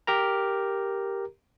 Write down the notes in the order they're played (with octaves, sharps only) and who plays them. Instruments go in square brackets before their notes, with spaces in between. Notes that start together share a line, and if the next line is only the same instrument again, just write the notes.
[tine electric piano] G4 A#4 A#5